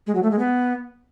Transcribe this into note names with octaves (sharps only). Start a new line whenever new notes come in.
G#3
F#3
A3
G#3
B3